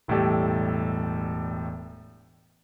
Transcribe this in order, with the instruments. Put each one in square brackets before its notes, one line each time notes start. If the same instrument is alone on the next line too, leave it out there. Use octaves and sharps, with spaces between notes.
[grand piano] E1 A2 G3 G4 A4